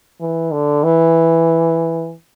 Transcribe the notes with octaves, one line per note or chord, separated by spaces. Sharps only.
E3
D3
E3